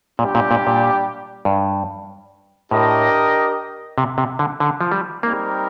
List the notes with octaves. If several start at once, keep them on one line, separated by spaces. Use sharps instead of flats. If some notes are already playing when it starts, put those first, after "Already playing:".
A#2 G3 D4 G4 D5
A#2
A#2
A#2
G2
A2 D4 G4 A#4 D#5
C3
C3
D3
D3
F3
G3
G3 A#3 C4 D#4 A#4